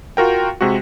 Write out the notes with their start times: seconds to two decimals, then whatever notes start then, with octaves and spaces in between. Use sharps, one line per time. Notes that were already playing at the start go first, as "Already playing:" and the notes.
0.17 F4 F#4 A#4 G5
0.61 C3 G#3 F#4